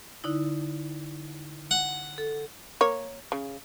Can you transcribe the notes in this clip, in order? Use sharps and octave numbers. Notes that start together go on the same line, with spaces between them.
D3 D#4 E4
F#5
A4
A#3 C#5
C#3